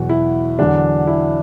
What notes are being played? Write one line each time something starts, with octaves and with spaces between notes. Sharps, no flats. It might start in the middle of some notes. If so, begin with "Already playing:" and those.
Already playing: E2 B2 F#3 F#4
E4
E2 D3 F#3 D4
E4